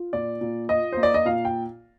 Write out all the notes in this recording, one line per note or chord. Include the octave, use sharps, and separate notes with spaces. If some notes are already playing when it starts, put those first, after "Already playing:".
Already playing: F4
A#2 D5
A#2
F4 D#5
A#3 C5
D5
D#5
A#2 F5
G5